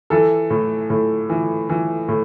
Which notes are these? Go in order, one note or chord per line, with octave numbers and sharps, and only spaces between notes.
E3 A4
A2
A2
E3
E3
A2